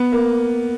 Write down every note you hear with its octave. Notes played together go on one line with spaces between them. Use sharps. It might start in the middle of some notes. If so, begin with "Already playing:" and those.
Already playing: B3
A#3